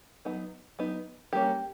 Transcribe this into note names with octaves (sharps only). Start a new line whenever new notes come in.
F#3 B3 D#4
F#3 B3 D#4
G3 A#3 C#4 G4